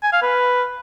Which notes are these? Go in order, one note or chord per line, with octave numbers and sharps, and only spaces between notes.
G#5
F5
B4